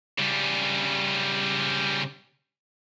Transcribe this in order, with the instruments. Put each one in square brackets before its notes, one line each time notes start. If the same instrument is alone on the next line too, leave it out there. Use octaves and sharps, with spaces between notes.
[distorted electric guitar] C#3 G3